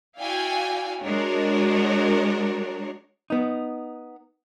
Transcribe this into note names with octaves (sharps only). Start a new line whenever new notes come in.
E4 F#4 D5 F5 G5 G#5
G#3 D4 F#4 A#4 C#5
B3 D#4